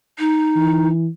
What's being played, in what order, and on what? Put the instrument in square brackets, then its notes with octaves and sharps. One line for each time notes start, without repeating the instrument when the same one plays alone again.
[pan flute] D#4
[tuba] E3